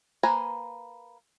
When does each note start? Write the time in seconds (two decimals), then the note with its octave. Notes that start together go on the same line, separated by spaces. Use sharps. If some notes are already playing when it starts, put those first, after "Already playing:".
0.23 A#3 B4 C5 G#5 A#5